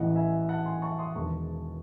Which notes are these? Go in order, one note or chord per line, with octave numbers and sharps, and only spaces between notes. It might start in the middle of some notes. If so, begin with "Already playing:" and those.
Already playing: A1 A2 E3 D#5 F#5
E5 G#5
F#5 A5
G#5 C6
A5 C#6
C6 D#6
E1 E2 D#3 A5 C#6